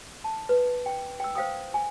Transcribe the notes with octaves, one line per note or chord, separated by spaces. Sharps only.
A5
B4
G5
G5 E6
C5 F5 G5 D#6
G#5